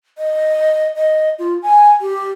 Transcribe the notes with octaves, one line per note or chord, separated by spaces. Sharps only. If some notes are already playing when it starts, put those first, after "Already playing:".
D#5
D#5
F4
G#5
G4